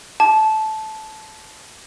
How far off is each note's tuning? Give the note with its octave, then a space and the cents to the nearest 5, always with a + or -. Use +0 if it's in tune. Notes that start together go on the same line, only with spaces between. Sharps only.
A5 -15